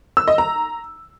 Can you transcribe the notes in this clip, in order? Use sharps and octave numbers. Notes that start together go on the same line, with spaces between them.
E6
D#5
A#5